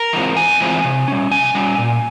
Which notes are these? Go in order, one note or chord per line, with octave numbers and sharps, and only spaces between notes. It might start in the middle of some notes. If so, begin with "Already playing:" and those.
Already playing: A#4
E3 G#3 C4 F4
E2 G#5
E3 G#3 C4 F4
C3
G3 C#4
C3 G#5
G3 C#4
A#2